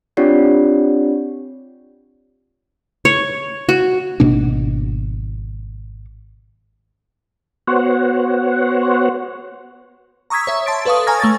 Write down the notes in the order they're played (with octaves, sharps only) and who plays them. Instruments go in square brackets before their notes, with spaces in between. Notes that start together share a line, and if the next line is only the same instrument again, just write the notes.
[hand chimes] C4 D4 F4 G4 C#5 D5
[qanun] C#5
F#4
[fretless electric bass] G#1 B2 A#3 D4
[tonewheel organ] B3 F#4 C5 C#5 F#5
[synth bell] A#5 C#6 D#6 E6 G#6 B6
C#5 E5
A5 C6 A6 D7
A4 B4 C#5 F5 C#6 D#6
G#5 A#5 C#6 F6 G#6 A#6
A3 C#6 A6